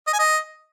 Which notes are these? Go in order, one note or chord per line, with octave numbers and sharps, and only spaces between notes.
D#5
G#5
D#5